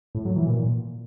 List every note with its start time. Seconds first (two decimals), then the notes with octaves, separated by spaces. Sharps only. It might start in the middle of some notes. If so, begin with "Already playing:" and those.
0.15 A2
0.25 F#3
0.36 E3
0.46 A#2